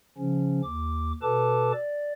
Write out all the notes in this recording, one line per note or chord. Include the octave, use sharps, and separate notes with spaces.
C#3 F3 C#4
D#2 D6
B2 A4 B4 A5 D6
D5